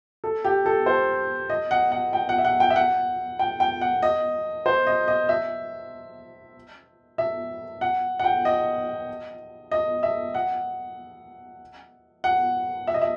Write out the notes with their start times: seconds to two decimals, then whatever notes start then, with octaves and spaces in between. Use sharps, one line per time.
0.24 A4
0.45 G4
0.66 A4
0.86 C5
1.50 D#5
1.71 F#5
1.92 F#5
2.13 G5
2.29 F#5
2.38 E5
2.45 F#5
2.60 G5
2.70 E5
2.76 F#5
3.39 G5
3.60 G5
3.81 F#5
4.03 D#5
4.66 C5
4.87 D#5
5.08 D#5
5.29 E5
7.18 E5
7.81 F#5
8.19 F#5
8.24 G5
8.45 D#5
9.71 D#5
10.03 E5
10.35 F#5
12.24 F#5
12.87 E5
12.94 D#5
13.02 E5